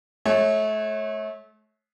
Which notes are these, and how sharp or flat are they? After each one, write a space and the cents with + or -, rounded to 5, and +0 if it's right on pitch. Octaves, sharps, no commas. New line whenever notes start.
A3 -35 C#5 -20